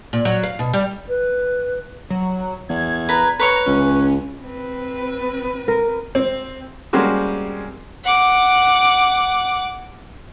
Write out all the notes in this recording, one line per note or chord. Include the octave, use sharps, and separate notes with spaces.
A#2
F#3
F5
B2
G3
B4
F#3
E2 G#6
B4 A#5
B4 C#5 A#5 C#6
C#2 C#4
C4 B4
A#4
C4
G3 G#3 A#3 C4 C#4 F#4
F#5 D6